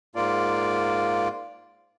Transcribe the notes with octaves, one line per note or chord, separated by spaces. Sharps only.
G#2 A#3 F4 D5